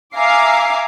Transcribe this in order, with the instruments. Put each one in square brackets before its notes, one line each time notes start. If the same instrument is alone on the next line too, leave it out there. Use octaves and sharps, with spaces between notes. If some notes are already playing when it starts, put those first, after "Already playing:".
[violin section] E5 F5 G#5 A#5 D6 C7